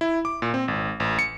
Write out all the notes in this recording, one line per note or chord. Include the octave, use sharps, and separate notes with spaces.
E4
D6
A#2
C4
G#1
A1
C#7